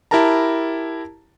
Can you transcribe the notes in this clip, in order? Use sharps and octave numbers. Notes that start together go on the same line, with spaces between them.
E4 G4 A#4 A5 A#5